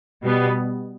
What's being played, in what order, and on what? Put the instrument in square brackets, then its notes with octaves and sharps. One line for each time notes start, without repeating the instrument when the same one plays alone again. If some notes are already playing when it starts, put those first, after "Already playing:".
[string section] B2 G3 B3